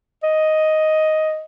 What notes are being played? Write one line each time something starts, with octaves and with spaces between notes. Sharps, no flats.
D#5